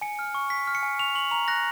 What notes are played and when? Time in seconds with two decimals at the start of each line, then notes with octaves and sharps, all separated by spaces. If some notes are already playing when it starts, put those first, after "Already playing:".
0.01 G#5 C#7
0.19 F6
0.35 C#6
0.50 C#6 B6
0.67 F6
0.75 C#7
0.83 G#5
0.99 C#6 F7
1.15 C#6 F#7
1.31 A#5 F7
1.48 F#6 A#6